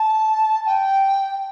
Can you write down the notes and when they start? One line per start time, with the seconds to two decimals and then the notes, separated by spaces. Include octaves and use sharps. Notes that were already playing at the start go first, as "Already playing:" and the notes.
Already playing: A5
0.66 G5